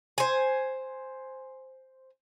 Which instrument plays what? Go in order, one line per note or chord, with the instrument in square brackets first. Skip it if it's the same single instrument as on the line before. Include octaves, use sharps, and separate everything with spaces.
[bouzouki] C5 G#5